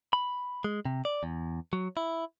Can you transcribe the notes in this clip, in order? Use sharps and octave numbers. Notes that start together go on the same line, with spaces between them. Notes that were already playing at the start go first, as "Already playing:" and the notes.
B5
G#3
C3
D5
E2
F#3
E4